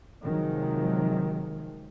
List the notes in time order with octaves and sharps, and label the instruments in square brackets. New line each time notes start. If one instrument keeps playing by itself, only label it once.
[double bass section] C3 D#3 F3 F#3 G#3